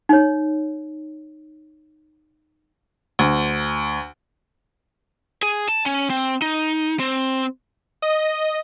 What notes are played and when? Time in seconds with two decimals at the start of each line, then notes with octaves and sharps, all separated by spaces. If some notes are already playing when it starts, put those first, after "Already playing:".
0.09 D#4 C#5
3.19 D2
5.43 G#4
5.69 A5
5.86 C#4
6.10 C4
6.42 D#4
7.00 C4
8.02 D#5